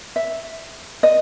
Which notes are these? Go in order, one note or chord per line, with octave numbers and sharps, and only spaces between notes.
E5
D#5